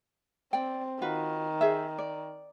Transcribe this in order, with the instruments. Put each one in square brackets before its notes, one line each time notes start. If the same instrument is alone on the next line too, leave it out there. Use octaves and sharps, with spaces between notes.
[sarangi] C4 [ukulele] D5 G5
[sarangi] D#3 [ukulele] F4 F#4 B4
[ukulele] G#4 C5 E5
D5